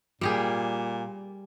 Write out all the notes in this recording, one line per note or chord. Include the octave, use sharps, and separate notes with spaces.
A#2 G3 G4 G#4